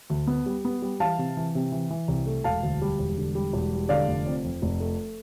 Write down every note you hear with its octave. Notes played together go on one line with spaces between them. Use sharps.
D2
B3
G3
B3
G3
E3 F5 A5
C3
E3
C3
E3
E3
C2
A3
E1 F5 A5
D2
G3
E1
D3
G3
E1
G3
D3 D5 F5
F1
F2
F2
F1
A3